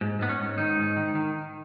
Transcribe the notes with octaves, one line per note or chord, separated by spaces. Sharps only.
G#2
G#2 B3
C#4
G#2
D#3 D#4
G#2
D#3
D#3